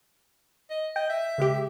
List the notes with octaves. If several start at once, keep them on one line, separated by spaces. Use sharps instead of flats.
D#5
D#5 G5
E5
C#3 G#3 G4